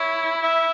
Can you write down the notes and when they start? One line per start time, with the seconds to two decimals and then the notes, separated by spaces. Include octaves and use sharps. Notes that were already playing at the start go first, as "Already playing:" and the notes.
Already playing: E4 C#5
0.43 E5